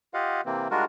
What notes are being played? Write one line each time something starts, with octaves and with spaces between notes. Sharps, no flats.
F4 G4 D#5 F5 F#5
C3 E3 A#3 C4
G3 G#3 D4 F4 F#4 A#4